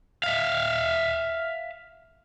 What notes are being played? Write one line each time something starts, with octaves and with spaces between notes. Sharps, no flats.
E5 F5